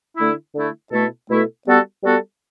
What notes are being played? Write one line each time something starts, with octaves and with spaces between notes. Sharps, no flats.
D3 A3 E4
D3 A3 E4
B2 A3 E4 A4
B2 A3 E4 A4
G3 B3 F#4 A4
G3 B3 F#4 A4